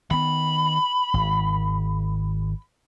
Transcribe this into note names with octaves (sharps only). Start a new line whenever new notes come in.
D#3 B3 B5
G#1